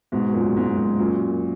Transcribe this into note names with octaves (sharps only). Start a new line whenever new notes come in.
G#2 B2
F#2 A#2
G#2
G#2
F#2 A#2